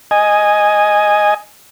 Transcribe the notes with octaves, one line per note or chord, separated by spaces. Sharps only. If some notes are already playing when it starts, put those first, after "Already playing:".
D#5 G#5